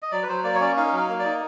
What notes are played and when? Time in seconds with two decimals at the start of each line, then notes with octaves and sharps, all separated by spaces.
0.02 D#5
0.12 F#3 D5
0.23 B4
0.29 F#3 C5
0.44 A#3 D5
0.55 C#5
0.60 C#4 D5
0.77 D#4 F5
0.93 F#3 F5
1.09 A#3
1.19 D5
1.24 D#4